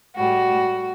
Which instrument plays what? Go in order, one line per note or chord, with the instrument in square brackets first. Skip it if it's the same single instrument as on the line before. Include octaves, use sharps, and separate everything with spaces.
[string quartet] A2 G3 F#4